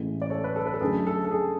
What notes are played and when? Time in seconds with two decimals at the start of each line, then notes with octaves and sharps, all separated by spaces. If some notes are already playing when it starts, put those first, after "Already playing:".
Already playing: A1 A2 E3 G#3
0.22 D5
0.30 A4 C#5
0.44 B4
0.56 A4
0.66 B4
0.74 A4
0.81 F#2 D3 F#3 A3 D4 G#4
1.07 A4
1.25 A4
1.31 G#4